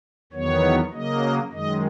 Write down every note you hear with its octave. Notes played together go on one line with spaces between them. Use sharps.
E2 D#3 F#3 B3 C#5
C#3 F#3 A#3 D#5
F#2 D#3 G#3 D#5